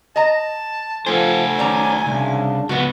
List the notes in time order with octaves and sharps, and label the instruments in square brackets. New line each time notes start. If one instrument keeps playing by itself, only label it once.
[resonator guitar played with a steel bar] D#5 A#5 [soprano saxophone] A5
[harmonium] F3 A4 [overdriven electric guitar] A3 C5 [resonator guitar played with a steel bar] F4 [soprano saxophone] G#5
[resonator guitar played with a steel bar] D#3 F#3 A#5 [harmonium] C#4 D5 A5
[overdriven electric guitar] C2 [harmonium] C#3 D4
[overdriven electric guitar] C#2 B3 [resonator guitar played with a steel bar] F#4 B4